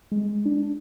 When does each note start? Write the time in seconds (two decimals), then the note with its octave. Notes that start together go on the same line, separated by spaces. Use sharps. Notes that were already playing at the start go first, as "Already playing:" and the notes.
0.12 G#3
0.45 D4